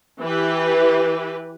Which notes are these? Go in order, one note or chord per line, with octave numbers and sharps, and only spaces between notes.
E3 G4 B4